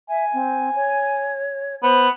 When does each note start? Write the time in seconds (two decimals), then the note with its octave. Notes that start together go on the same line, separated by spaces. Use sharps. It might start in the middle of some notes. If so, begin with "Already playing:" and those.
0.09 E5 G#5
0.33 C4
0.75 C#5
1.83 B3 C5